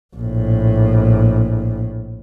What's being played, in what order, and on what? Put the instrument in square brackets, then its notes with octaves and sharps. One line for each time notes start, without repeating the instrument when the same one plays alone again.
[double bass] A#1 A2